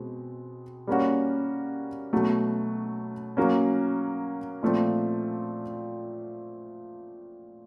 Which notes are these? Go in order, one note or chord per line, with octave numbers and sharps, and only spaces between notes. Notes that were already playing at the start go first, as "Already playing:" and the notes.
Already playing: B2 G#3 C4
G3 A#3 C#4 F#4
B2 F#3 A3
F#3 A#3 C#4
A#2 F3 A3 C4